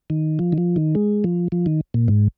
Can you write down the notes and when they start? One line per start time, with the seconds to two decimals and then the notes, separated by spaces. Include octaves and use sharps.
0.10 D#3
0.39 F3
0.52 D#3
0.58 F3
0.76 D#3
0.95 G#3
1.24 F3
1.52 F3
1.66 D#3
1.94 A#2
2.08 G#2